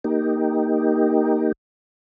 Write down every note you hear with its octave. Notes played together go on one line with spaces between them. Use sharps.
A#3 D#4 G4